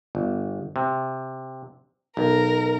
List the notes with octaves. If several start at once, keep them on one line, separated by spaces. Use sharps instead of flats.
G1
C3
B1 A#4